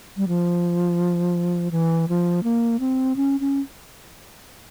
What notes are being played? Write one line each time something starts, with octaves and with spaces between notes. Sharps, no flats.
G3
F3
E3
F3
A#3
C4
C#4
C#4